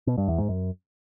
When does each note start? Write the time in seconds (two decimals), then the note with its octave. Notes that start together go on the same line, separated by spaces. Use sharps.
0.07 B2
0.18 G2
0.28 E2
0.38 G#2
0.49 F#2